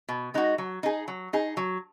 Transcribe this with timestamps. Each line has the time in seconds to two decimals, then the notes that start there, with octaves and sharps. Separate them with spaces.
0.09 B2
0.34 G#3 D#4 F#4
0.58 F#3
0.83 D#4 G#4
1.08 F#3
1.33 D#4 G#4
1.57 F#3